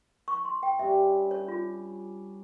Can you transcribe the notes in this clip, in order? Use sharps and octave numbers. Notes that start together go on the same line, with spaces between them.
C#6
C6
G5
G2 G3 C#4 G4 E5
C#5
F4